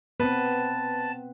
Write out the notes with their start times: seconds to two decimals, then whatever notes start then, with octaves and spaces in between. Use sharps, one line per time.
0.20 B3 C4 B4 A5